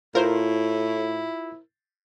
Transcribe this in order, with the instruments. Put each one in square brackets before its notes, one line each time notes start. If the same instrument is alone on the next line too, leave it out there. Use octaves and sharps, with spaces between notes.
[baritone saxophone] A2 [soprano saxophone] E4 [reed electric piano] F4 [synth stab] A#4 C5